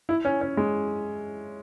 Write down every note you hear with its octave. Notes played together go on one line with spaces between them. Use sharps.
E4
C#4
C#4
G#3